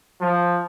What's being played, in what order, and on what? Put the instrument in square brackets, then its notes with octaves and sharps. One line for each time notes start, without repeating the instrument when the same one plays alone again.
[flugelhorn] F3